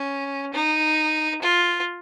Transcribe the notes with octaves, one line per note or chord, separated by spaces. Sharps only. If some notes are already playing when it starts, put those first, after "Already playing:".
Already playing: C#4
D#4
F4